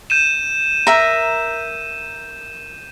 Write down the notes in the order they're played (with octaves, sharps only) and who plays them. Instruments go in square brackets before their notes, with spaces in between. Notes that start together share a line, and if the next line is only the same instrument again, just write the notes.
[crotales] G6 D#7 E7
[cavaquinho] A#4 E5 A#5